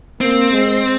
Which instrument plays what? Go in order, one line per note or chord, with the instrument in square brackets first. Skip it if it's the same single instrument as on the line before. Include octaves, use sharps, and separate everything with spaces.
[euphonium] A#3 [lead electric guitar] C4
[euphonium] G#3